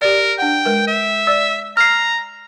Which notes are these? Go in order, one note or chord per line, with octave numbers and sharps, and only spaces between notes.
G4 A#4 D5
D4 F#5 G5
G#3 A#4 B4
E5
D5 E6
A#5 F6 C7